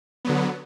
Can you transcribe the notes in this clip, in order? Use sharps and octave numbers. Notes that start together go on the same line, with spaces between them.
D3 F#3 B3